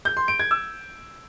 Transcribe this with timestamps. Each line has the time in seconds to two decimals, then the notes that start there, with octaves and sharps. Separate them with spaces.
0.05 G6
0.17 C6
0.28 D7
0.40 G#6
0.51 E6